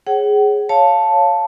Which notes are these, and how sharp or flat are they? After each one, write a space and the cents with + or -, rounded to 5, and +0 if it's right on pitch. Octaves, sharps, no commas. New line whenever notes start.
G#4 +0 C#5 -20 F#5 +40
C#5 +0 F5 +0 A5 +0